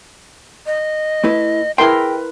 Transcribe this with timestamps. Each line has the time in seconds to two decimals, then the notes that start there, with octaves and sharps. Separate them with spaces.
0.66 D#5
1.24 A3 E4 B4
1.78 E4 G#4 A#4 B4 G5 C6